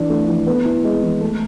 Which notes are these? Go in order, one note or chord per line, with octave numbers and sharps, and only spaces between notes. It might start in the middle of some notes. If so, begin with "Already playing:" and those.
Already playing: E3 D4
A3
E3
B3
E4
G#3
E3
A3